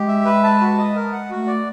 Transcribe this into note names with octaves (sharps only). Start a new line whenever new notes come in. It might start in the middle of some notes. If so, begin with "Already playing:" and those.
Already playing: G#3 G4
E5
B4
A5
F#4
D#5
A#4
F#5
A3 F#4
D5